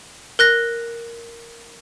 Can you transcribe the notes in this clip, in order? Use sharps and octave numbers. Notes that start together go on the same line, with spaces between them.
A#4 F#6 A#6